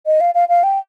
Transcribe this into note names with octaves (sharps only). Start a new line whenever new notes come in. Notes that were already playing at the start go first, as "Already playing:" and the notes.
D#5
F5
F5
F5
G5